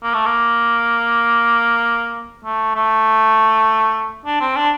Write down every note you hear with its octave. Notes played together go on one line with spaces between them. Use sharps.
A#3
A3
A#3
A3
A3
D4
C4
D4